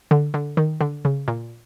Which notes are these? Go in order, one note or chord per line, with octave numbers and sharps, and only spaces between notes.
D3
D3
D#3
D3
C#3
A#2